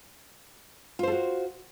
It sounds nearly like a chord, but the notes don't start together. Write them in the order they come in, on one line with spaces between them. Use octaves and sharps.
F4 C5 A4 F#4